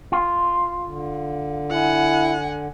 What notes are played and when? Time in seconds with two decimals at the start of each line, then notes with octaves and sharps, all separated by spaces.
0.12 F4
0.85 D3
1.71 E4 F#5 G#5